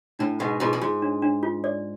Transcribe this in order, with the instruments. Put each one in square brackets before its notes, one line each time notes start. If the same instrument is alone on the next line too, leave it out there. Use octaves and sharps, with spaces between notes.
[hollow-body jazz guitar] A2 [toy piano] D4
[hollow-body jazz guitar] G#2 B2 [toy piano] F#5
[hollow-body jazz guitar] G#2 B2 [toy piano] F4
[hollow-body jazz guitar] F#2
[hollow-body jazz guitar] G#2 [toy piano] F4
[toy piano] D4
D4
F4
D5